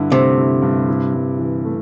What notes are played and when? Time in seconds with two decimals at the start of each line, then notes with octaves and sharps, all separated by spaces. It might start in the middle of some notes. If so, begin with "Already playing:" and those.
Already playing: G2 D3 E4
0.12 C3 A3
0.38 E4
0.62 G2
0.88 E4
1.14 G2
1.39 E3
1.65 A3